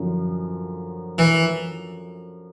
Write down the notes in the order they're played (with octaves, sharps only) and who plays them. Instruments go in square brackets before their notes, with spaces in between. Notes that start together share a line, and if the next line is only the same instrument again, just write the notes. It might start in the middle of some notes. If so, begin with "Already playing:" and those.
Already playing: [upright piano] F#2 D3 F3
[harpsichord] E3